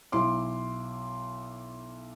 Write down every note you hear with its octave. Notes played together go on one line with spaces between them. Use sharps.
B1 E4 C6 D6